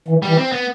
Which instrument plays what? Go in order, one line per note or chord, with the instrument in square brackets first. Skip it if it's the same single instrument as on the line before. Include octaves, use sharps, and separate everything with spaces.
[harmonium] E3
[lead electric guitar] G3
[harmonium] E3
[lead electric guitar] C4
B3